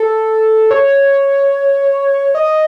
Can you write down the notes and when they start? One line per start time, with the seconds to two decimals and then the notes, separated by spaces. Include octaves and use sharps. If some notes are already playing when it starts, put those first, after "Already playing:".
Already playing: A4
0.71 C#5
2.35 D#5